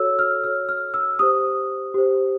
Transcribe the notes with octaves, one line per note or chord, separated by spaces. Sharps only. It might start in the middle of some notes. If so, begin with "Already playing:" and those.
Already playing: F#4 A4 C#5 E6
F6
F#4 A4 C#5 F6
F6
E6
G4 C5 D#6
G4 C5